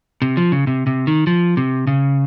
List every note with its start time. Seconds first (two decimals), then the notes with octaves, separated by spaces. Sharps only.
0.22 C3
0.37 F3
0.52 C#3
0.67 C3
0.87 C3
1.07 D#3
1.27 F3
1.57 C3
1.87 C#3